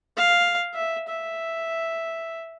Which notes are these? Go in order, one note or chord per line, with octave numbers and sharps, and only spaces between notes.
F5
E5
E5